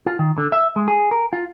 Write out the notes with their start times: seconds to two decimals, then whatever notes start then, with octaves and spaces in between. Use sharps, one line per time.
0.06 F4
0.19 D#3
0.38 D3
0.52 E5
0.76 G#3
0.88 G#4
1.11 A#4
1.33 F4